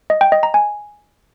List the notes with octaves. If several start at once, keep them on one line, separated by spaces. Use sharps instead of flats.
D#5
G5
D#5
A#5
G#5